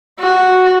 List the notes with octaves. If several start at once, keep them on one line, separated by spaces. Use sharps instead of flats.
F#4